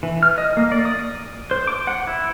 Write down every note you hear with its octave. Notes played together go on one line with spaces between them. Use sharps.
E3
F6
D#5
A#3
D5
D#6
C5
D6
F#5
E4